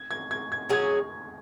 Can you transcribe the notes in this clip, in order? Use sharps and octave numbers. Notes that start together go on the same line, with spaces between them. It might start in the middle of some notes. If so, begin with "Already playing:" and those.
Already playing: G#6
G#6
G#6
G#6
F#3 C#4 G#4 G#6